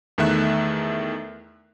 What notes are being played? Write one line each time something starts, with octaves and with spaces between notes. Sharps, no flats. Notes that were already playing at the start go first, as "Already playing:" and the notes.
E2 D#3 A3 E5 F#6